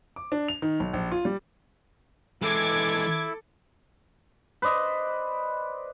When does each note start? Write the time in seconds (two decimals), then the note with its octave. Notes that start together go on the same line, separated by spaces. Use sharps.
0.16 D6
0.32 D4
0.48 F7
0.62 D#3
0.80 B1
0.93 A#1
1.11 F4
1.25 G3
2.42 E3 G#3 E4 A4 D6 G#6
4.62 B4 C5 D5 D#5